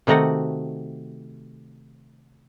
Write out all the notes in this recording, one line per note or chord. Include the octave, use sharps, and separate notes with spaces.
C3 D#3 A3 D#4 F#4 F#5